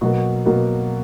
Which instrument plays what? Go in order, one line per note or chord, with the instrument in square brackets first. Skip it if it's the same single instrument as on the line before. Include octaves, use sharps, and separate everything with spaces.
[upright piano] B2 F#3 A#3 F#4
B2 F#3 A#3